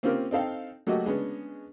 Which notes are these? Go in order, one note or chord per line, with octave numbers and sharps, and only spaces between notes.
A#3 C4 C#4 F4 G4 A#4
C4 D#4 A4 F5 G5
F#3 A3 A#3 F#4 G4 D#5
G#3 B3 C#4 D4